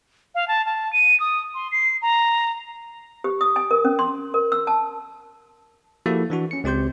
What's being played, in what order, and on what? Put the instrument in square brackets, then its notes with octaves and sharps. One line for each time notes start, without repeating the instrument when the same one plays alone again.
[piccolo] F5
A5
A5
D#7
D#6
C6
C7
A#5
[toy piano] G4
D#6
G#5
A#4
C#4
C6
A#4
E6
A5
[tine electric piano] F3 A#3 E4 F#4 G4 A4
E3 D4 F#4
C#4 C#7
C#2 C4 G4 C6 G6